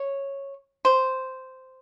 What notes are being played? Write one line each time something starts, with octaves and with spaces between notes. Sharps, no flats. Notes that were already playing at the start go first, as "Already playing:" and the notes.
Already playing: C#5
C5